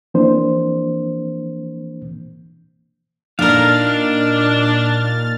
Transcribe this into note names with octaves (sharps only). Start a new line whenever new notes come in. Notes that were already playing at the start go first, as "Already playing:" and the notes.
E3 F3 A#3 C4 D4 C5
A#2 D4 D#4 A#4 F5 F6 A6